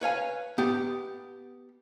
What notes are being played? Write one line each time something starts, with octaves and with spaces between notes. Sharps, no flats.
B4 C#5 F5 G#5
B3 G4